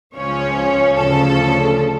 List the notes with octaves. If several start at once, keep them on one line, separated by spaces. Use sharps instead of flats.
C#2 C#3 F3 C#4 C#5
D2 C#3 F3 C#4 A4